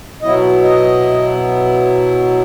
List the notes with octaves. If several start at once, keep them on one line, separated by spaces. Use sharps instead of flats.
B2 F#3 B3 E4 D#5
D#5